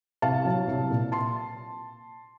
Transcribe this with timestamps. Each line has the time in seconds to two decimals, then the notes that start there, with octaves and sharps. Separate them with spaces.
0.22 C2 F5 A5
0.45 F#3
0.67 C2
0.90 A#2
1.12 A5 C6